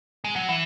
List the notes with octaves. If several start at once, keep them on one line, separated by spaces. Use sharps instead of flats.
G#3
F#3
E3